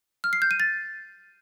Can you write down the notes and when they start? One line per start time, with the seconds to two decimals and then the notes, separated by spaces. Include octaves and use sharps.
0.24 F6
0.33 C7
0.42 G6
0.51 D#7
0.60 A6